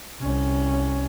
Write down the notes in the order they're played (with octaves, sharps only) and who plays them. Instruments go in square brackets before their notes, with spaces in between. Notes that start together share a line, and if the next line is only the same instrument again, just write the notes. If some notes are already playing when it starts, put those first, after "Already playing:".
[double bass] C2 C#4